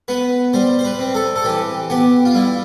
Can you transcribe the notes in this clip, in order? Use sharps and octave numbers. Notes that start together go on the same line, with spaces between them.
B3 B4
G3 C5
C5
B4
C4
A4
A4
E3 G4
B3 G4
F4
G3 E4